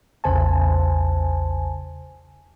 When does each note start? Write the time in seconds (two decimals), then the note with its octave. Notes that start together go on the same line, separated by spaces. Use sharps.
0.24 A#1 E2 C#3 C5 G#5 A5